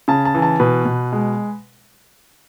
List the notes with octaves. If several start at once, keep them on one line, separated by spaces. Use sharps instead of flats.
C#3 A5
A5
E3
A5
B2 B4
B2
G#3